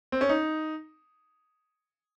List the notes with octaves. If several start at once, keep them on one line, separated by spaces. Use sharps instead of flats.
C4
C#4
D#4